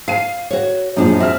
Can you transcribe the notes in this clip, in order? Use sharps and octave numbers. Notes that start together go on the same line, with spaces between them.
F5 C7 D#7
F#4 C#5
F#2 A#2 F3 G#3 D4 D#4
C4 E5 F6